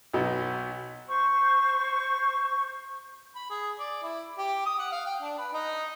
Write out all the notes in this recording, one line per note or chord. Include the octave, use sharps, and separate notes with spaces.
B1 B2 D#4
C5 C#6
B5
G#4
D5
E4
G4
D#6
F#5
F5
G5
D4
B4
D#4